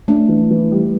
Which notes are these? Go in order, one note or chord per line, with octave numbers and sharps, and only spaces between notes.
A3 D4
E3
E3
G3